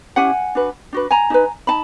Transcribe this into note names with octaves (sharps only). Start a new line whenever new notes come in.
C#4 E4 G4 F#5 G#5
D4 F#4 B4
D4 F#4 B4
G#5 A#5
D#4 G4 B4
D#4 A5 B5